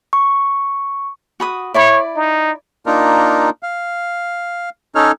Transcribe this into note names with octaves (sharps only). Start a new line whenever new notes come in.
C#6
F#4 B5 D#6
E4 C#5 D5 B5
D#4
A#3 D4 D#4 F4 A#4
F5
C#4 D#4 A4 C#5 F6